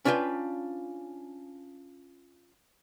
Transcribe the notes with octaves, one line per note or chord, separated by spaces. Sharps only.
C#4 D4 F4 B4 G5